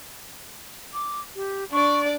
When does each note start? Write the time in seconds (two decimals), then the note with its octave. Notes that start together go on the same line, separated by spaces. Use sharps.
0.93 D6
1.35 G4
1.72 D4 D5 C#6